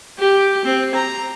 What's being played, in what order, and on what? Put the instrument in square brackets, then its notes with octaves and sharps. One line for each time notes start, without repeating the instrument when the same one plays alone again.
[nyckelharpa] G4
C4
A#5